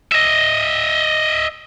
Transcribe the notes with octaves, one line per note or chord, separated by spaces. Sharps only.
D#5 E5